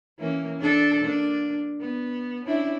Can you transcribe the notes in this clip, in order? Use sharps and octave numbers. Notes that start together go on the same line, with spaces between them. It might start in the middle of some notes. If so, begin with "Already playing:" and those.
E3 A#3 C#4
D4 A4
A#3 D4
B3
C#4 D4 E4